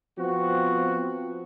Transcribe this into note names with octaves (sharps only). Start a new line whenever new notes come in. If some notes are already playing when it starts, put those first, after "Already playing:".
F3 B3 C4 F#4